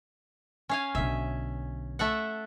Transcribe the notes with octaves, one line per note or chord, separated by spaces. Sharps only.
C#4 F5 G#5
B1 D3 E5
A3 E5 F#5